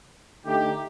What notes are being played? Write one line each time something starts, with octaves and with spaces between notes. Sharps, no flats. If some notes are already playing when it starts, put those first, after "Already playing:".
D3 A3 D#4 G4